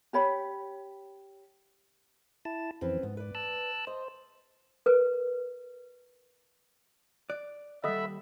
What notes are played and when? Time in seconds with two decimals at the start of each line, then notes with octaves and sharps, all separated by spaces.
0.13 G4 C#5 B5
2.45 E4 A5
2.81 F2 E3 C4 C#4 B4
3.03 G#2 B3
3.17 B4 D5
3.35 A5 E6 F#6
3.87 C5 D#5
4.86 A#4 B4
7.30 D5 F#6
7.84 D#2 G3 A4 D#5 E5 F#5 B5 D#6